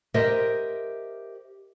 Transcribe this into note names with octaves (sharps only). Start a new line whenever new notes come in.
G4 A#4 C5 D#5 E5